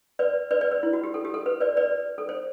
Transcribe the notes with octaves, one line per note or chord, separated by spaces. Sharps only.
B4 D5
B4 D5
B4 D5
B4
E4
F#4
G4
A4
G4
A4
B4
B4 D5
B4 D5
A4
C5